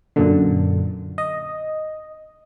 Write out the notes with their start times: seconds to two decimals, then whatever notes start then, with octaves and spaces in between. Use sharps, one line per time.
0.16 F#2 A#2 D3
1.18 D#5